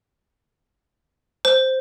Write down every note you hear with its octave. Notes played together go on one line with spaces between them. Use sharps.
C5